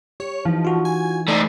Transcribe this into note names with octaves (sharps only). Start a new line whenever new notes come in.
G4 C#5
E3 F3 D#4
F4 F#4
G#5
A3 D#4 D5